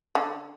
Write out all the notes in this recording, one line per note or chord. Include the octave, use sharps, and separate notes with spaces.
D3